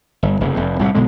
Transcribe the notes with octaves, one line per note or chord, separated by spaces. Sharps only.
G1
F1 C#3
F1 F2
C2 A2 C3
B1 B2 D3 G#3